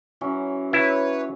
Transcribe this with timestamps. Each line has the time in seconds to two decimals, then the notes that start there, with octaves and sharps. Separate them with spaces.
0.21 E3 F#3 C#4
0.73 E4 B4 C#5